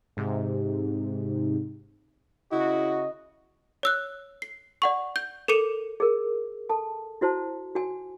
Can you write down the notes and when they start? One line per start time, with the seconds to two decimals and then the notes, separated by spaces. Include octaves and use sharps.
0.17 G#2 C3
2.52 C#3 E4 F#4 D#5
3.83 C#5 E6 F#6
4.42 C7
4.82 D5 F#5 C#6
5.16 G6
5.48 A4 A#4 D6 C#7 D#7
6.00 G#4 A#4
6.69 A4 A5
7.21 E4 F#4 C5 A5
7.75 F#4 G#5